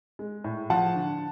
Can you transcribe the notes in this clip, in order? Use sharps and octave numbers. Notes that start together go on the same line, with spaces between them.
G#3
A2
F3 F#5 A5
D3